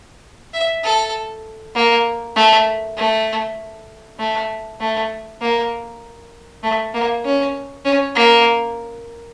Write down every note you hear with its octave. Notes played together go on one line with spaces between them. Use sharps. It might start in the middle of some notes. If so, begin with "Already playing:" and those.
E5
A4
A#3
A3
A3
A3
A3
A#3
A3
A#3
C#4
C#4
A#3